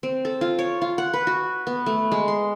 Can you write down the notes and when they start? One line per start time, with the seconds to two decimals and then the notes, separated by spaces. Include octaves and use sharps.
0.03 C4
0.25 A4
0.41 F4
0.59 C#5
0.82 F4
0.98 F#5
1.14 B4
1.27 F#4
1.67 B3
1.86 A3
2.12 G#3
2.28 C6